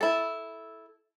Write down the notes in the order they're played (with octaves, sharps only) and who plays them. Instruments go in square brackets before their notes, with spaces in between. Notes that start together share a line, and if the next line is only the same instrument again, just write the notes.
[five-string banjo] E4 A4